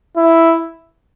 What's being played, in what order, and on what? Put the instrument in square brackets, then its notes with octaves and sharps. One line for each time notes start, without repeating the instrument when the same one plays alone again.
[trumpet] E4